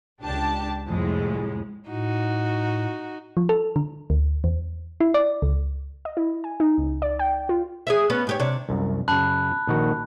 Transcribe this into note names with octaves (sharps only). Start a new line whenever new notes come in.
C#2 D4 G4 A5
C2 F2 A2 G#3
A2 D#4 F#4
F3
A4
D3
D2
E2
E4
D5
C#2
D#5
E4
G#5
D#4
C#2
D5
G5
F4
G#4 C#5 E5
B3 C#4
G#2 G4 C#5
C3 D4 C#5
C2 F#2
F#2 C#3 A5 B5 F#6
A#1 D#3 F#4